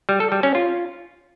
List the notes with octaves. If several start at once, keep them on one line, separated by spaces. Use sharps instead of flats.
G3
A4
G3
C#4
F4